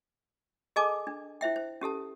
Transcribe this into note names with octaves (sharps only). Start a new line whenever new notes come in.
G#4 A4 D#5 G#5 A5 D6
D4
E4 C5 E5 G5
C5
C#4 G4 A4 A5